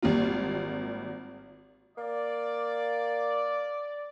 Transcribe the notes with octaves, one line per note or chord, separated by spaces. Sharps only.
G#1 G3 A#3 F4
A#3 D5